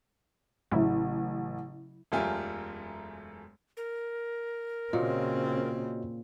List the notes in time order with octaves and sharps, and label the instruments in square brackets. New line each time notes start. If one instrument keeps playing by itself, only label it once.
[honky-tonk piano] A1 [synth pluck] C#3 F#3 E4
[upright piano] E1 F#2 A3 F4 G4 G#5
[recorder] A#4
[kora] A#2 [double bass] C#3 C4 [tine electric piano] F#4 C#5 D#5